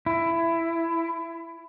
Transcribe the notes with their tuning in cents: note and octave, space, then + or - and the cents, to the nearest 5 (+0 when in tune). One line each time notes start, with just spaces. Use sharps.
E4 +15